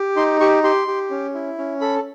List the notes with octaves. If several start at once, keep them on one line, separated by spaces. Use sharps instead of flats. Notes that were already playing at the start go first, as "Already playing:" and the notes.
Already playing: G4
D#4 C6
G4 C#6
G4 C6
G4
C#4
E4
C#4
A4 B5